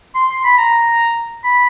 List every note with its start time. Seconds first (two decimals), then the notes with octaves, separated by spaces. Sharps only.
0.15 C6
0.29 C6
0.44 B5
0.58 A#5
1.44 B5